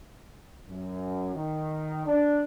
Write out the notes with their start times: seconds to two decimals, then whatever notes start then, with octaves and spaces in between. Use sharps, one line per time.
0.68 F#2
1.34 D#3
2.06 D4